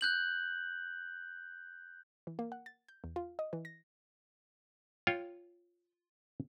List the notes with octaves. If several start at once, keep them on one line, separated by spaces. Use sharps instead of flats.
F#6 G6 F#7
E3
A#3
F#5
A6
G6
E2
F4
D#5
E3
A#6
F4 C#5 G5